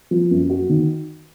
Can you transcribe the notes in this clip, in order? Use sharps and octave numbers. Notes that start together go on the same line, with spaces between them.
F3
F#2
F#4
D#3